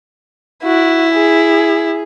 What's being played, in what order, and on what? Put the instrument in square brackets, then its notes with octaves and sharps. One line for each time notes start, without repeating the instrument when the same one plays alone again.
[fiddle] E4 [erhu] F#4
[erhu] G#4